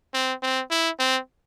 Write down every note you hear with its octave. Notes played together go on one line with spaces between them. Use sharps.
C4
C4
E4
C4